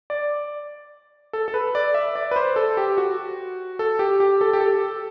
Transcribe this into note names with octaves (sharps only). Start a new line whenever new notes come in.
D5
A4
A4
B4
D5
E5
D5
B4
C5
A4
G4
F#4
A4
G4
G4
A4
G4
A4